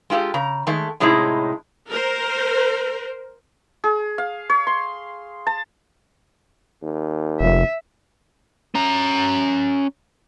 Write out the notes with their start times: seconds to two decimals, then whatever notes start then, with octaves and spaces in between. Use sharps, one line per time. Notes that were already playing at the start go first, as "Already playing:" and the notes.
0.10 G#3 F4 G4 A4
0.34 C#3 A#5
0.67 D#3 G#3 A3
1.00 A2 C3 G#3 C#4 D#4 E4
1.90 A#4 C5
3.84 G#4
4.18 F5
4.49 C#5
4.67 C6
5.47 A5
6.83 D#2
7.41 F1 E5
8.75 C#4 A#5